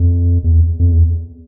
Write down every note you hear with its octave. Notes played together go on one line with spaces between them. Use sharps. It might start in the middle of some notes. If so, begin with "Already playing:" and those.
Already playing: F2
E2
F2
E2